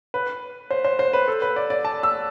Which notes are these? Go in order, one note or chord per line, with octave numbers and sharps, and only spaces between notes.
B4
C5
C5
C5
B4
A4
B4
D5
D5
A5
E6